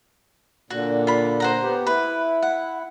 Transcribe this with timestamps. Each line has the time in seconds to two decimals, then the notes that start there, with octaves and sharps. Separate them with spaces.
0.70 A#2 D3 F#4
1.07 F4 B5
1.40 C5 F#5 A#5
1.62 B3 G4
1.87 E4 B4
2.42 F#5